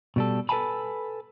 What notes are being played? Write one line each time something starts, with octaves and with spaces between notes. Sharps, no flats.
B2 G3 A4
A4 B4 F5 G#5 A5 B5